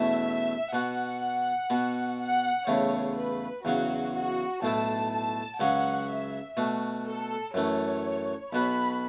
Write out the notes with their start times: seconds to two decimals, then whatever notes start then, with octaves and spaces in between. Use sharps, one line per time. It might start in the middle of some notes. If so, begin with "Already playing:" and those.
Already playing: E2 B2 A3 C#4 E4 E5
0.73 B2 B3 F#4 F#5
1.70 B2 B3 F#4
2.19 F#5
2.67 E2 C#3 A3 E4 C#5
3.16 B4
3.64 E2 C#3 F#3 F#4
4.14 F#4
4.62 B1 A2 A3 E4 A5
5.11 A5
5.60 C#2 C#3 F#3 C#4 F#4 F#5
6.08 E5
6.57 B2 A3 F#4
7.06 A4
7.54 F#2 E3 A3 C#5
8.52 B1 B2 B3 F#4 B5